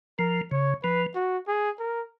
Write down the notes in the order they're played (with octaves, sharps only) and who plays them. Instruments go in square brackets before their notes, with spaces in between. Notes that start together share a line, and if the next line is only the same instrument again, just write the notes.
[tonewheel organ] F3 [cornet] A#4
[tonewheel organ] C#3 [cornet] C#5
[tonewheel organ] F3 [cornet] B4
[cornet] F#4
G#4
A#4